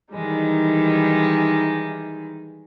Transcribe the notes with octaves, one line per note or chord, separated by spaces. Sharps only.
D#3 E3 G3 G#3 D#4